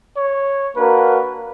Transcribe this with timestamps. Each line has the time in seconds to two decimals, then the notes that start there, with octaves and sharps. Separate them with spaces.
0.17 C#5
0.76 A#3 D4 F#4 A#4 B4